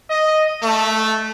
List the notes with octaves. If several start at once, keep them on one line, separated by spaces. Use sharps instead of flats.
D#5
A3